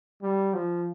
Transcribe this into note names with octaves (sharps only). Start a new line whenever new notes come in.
G3
F3